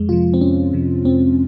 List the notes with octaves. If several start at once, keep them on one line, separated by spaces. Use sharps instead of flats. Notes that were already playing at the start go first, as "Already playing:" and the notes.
Already playing: F2 G#3
C3 F3 F4
C4
F2 C#4
C3 F3
F2 C4